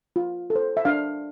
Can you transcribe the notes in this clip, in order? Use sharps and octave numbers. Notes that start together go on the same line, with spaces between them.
F4
A4
C5
E5
D4 F5